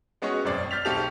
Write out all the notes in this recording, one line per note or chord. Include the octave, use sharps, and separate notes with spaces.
G#3 B3 C#4 F#4 C#5 D#5
E1 A1 F#2 C4 D5
F6 G6 A6 B6 F7
B1 C4 G4 A4 F7